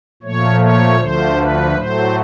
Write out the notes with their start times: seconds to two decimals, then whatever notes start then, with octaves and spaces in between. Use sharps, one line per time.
0.23 A#2 F3 A3 C#5
0.61 C#5
0.99 D2 D3 F3 A3 C5
1.38 B4
1.75 A2 F#3 A3 C5